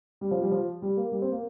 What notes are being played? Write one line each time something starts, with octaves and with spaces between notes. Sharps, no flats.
G3
F3
G3
F3
G3
A#3
G3
C4
A#3